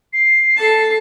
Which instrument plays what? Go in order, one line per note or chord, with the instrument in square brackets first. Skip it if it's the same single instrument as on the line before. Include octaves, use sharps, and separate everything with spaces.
[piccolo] C7
[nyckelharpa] A4 A5